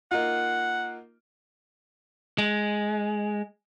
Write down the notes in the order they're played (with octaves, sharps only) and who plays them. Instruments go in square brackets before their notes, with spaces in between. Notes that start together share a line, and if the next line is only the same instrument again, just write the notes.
[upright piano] A#3 D#4 F4 [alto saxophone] F#5
[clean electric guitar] G#3